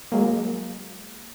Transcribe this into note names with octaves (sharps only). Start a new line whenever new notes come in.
F#3 G#3 A#3